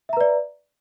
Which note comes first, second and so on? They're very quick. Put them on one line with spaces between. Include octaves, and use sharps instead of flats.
E5 A#5 B4 D5